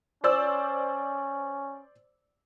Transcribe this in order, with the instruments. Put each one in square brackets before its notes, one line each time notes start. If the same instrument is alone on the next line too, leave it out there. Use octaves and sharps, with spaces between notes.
[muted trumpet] C#4 [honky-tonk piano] C5 D5 E6